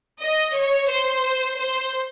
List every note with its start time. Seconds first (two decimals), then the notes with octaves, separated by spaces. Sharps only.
0.21 D#5
0.55 C#5
0.89 C5
1.58 C5